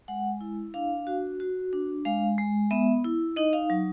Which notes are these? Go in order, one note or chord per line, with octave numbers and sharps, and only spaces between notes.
G#3 F#5
E4
D4 F5
F#4
F#4
D4
G#3 F5
G#3
B3 E5
E4
D#4 D#5
F5
F#3